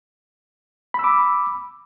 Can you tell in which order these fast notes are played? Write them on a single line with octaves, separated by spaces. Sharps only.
B5 E6 D6